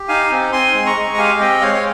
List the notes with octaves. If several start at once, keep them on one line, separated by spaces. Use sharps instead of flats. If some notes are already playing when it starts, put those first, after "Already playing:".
Already playing: G4
D#4 F5 G#5
C4
C4 G#5 C6
G#3
A#5 C#6
G#3
A#5
G4 F5 G#5
G#5
C4 D#5 G5
G#3 C#5 F5
C#5